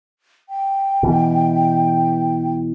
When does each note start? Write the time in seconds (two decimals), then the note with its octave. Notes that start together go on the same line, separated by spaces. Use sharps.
0.49 G5
1.03 B2 E3